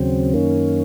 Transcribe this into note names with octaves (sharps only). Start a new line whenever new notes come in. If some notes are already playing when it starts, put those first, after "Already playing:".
Already playing: D#2 C#3 F#3 C4
F#2 D#3 A#3 C#4